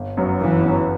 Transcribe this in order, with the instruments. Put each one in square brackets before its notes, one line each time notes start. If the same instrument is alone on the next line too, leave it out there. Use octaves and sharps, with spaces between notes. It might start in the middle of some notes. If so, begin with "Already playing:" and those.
Already playing: [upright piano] G1
F#2 F#3 B3
[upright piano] G1 [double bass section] E3
[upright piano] F#2 F#3 B3